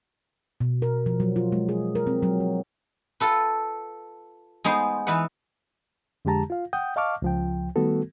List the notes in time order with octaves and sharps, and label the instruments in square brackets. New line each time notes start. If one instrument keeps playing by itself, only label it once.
[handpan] B2
A#4
F3
F#3
F4
G#3
G#4
A#4
C4
F#3
F3
[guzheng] F4 A4 B4
G#3 B3 D#4 C5
E3 D#4 B4 F#5
[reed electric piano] F2 D3 G#3 G4 A5 A#5
F4 F5
F#5 G5 D#6 G6
D#5 F5 A5 C#6 D6 F6
C#2 F3 G5
D#3 G3 A3 B3 F#4 A4